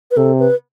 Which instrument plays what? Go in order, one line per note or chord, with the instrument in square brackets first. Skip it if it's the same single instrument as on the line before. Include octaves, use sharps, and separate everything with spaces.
[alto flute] B4
[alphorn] C3 [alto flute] A4
[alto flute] B4